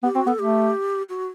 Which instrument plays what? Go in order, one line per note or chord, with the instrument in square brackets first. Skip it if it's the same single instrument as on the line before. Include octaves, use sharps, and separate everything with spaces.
[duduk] B3 [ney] G4
[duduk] C4 [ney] F#4
[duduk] B3 [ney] A4
[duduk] A3 [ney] G4
[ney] F#4